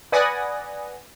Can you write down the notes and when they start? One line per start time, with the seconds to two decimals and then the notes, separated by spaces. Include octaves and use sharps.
0.12 B4 D5 F#5 G#5 D#6 A#6